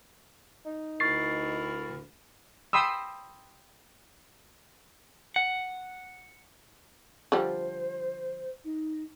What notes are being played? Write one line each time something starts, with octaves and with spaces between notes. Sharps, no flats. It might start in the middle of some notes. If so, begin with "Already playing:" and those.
D#4
D2 E4 A#4 C#6 A6 C7
G5 B5 C6 D#6 E6
F#5
D3 F3 G3 C5
D#4